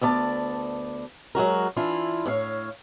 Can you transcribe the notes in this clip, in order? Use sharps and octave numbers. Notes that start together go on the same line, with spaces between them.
D2 B3 D5 A5
F#3 G#3 F#4 A#4
E3 D4 E4 F4
A2 C#5 F5